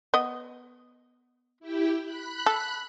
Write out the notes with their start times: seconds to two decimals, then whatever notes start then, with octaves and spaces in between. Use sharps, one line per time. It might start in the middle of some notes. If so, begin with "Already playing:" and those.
0.14 B3 D#5
1.60 E4 G4 G5
2.02 B5 F#6
2.46 A4